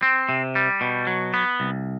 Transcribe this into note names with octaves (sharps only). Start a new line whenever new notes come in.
C4
C3
G3
B2
F#3
B3
C2